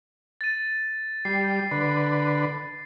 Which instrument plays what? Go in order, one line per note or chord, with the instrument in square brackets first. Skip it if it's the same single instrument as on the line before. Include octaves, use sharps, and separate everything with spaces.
[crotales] A6 D#7
[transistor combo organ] G3 [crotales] C7
[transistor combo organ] D3 B4